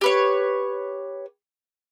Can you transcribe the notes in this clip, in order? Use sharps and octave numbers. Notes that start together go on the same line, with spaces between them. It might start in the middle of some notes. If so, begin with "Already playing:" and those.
G4 B4 C#5